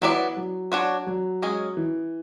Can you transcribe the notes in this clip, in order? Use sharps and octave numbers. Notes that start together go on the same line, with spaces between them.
E3 F#3 B3 E4 B4 D5
F#3
D4 F#4 C#5
F#3
G#3 C#4 G#4
E3